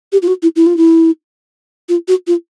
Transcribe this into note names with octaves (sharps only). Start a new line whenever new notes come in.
G4
F4
F#4
E4
E4
F4
E4
F4
F#4
F4